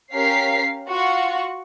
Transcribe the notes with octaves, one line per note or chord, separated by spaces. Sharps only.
C#4 G4 A#4 F5 B6 C7
F4 F#4 F#5 C#6